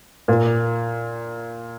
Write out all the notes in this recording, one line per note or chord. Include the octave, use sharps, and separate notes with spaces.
A#2